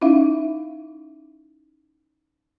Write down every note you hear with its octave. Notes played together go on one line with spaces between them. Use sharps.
C#4 D#4 E4 E5 F5